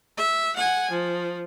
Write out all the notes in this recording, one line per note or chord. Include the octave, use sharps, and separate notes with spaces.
E5
F#5 G#5
F3